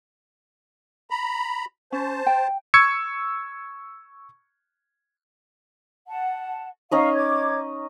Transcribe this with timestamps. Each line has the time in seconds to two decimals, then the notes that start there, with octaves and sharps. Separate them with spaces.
1.10 A#5 B5
1.92 C#4 C5 A5
2.26 G5
2.74 C#6 E6 G#6 C#7
6.07 F#5 A5
6.91 C#4 D#4 D#5 F5 C#6
7.15 C#5 D6 G#6